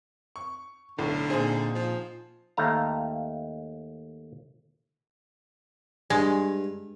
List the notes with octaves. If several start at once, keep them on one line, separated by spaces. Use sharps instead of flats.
C#6
B1 A2 D3
A#2 C4 D#4 G#4 C5
F3
D#2 A3 F5 A#5
G2 G#3